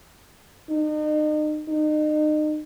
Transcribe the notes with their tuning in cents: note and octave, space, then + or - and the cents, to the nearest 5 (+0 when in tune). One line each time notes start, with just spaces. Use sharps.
D#4 -40
D#4 -35